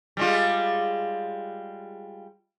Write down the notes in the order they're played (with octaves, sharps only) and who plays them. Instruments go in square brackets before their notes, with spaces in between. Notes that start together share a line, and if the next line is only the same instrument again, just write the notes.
[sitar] G3 G#3 F4